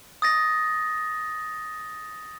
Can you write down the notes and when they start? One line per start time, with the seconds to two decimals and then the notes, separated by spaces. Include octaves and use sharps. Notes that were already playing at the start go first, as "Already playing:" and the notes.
0.22 D#6 A6 A#6